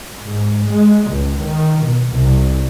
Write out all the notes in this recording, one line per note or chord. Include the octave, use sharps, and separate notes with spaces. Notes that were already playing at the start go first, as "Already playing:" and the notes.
G#2
G#3
C#2
D#3
B2
C2